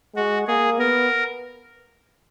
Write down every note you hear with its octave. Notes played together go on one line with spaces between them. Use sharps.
G#3 F#4
A#3 G#4
B3 A#4